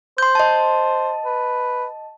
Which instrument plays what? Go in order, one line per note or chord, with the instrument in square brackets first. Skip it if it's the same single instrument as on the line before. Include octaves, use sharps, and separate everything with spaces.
[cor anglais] C5 [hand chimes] C6 G6
[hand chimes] D#5 A5
[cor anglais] B4